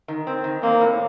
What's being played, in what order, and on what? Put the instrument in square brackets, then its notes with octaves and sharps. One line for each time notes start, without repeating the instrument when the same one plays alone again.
[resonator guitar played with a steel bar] D#3
C4
D#3
[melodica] A#3 [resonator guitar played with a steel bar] C4
[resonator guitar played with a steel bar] A2